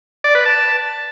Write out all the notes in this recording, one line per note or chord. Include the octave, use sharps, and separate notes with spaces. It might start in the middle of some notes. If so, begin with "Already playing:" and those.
D5
B4
A5